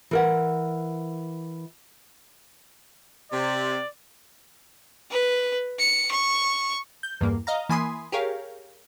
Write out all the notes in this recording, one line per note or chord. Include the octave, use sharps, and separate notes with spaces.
E3 A#4 F#5
C3 D5
B4
C#7
C#6
G6
E2 G2 A#3
D#5 F5 A#5
E3 A#3 G#5 B5 C6 D#6
G4 G#4 A#4 C#5 F5